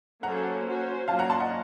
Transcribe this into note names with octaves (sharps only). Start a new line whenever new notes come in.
F#3 A#3 C#4 A4 C5 F#5 A#5
C#4 F#4 C5
F#3 A#3 C#4 F4 F5 A5
F#5 A#5
A5 C6
D#5 F#5